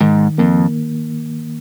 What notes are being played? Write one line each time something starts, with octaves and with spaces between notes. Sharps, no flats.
G#2 D#3
F2 A#3